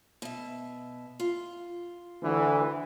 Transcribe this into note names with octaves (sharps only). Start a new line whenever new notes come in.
B2 E5
F4
D2 E3